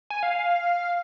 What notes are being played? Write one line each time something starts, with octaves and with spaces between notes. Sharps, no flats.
G#5
F5